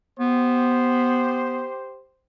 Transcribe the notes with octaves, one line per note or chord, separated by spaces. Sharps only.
B3 G4 C5